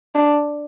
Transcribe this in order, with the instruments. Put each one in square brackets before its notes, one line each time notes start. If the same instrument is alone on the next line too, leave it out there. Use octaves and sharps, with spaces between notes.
[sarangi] D4